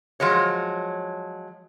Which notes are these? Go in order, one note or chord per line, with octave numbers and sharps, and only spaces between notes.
F3 F#3 G#3 C#5